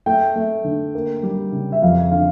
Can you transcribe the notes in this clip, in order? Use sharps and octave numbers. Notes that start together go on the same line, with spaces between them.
A3 G5
A3
D3
A#3
G3
C#3
E5
F2 F5
D3 F5